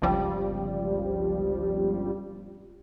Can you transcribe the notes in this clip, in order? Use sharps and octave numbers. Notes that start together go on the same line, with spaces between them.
G1 C#2 F3 G3